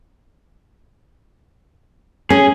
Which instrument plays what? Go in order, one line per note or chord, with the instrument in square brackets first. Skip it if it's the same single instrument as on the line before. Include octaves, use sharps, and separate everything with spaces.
[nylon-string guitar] C#4 [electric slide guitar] G#4